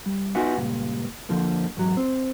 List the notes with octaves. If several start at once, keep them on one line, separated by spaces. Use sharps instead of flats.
G3
B3 D#4 F4 F#4 E5 G#5
C#2 G2 A#2
F2 D3 F3 A#3
E2 G#2 F#3
C4